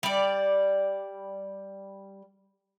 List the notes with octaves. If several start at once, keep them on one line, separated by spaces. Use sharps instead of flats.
G3 D5